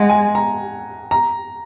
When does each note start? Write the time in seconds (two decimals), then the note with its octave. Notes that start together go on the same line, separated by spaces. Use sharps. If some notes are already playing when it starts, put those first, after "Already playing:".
Already playing: G#3 F#5
0.10 G#5
0.35 A#5
1.11 A#5